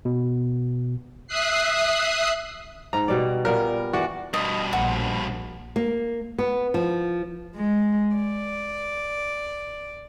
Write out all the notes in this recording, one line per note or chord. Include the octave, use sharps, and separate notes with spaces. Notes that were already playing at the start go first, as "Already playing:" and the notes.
B2
E5 D#6 F#6 C7
G#2 A#5
B2 G3 D5
A#2 G3 B3 A#4
E3 F#4 D5
G2 B2 D#5
A#1 F#4
A#3
B3
F3
G#3
D5